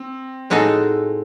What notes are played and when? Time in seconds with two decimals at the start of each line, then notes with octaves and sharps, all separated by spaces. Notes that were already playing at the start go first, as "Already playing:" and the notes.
Already playing: C4
0.50 A2 G#3 D#4 F#4 A4